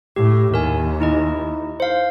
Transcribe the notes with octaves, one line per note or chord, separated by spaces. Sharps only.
A2 G4
D#2 A#4 G#5
D#4 E4 D#5
C5 F5